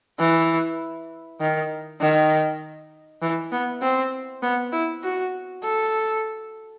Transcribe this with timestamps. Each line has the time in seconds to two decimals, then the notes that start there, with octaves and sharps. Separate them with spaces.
0.19 E3
1.41 D#3
2.01 D#3
3.22 E3
3.52 B3
3.82 C4
4.43 B3
4.72 E4
5.04 F#4
5.63 A4